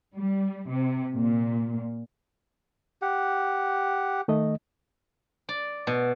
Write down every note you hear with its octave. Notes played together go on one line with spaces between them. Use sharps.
G3
C3
A#2
G4 F#5
D#3 A3 D#5
D5
B2